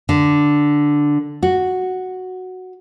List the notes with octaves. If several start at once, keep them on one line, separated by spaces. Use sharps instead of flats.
D3
F#4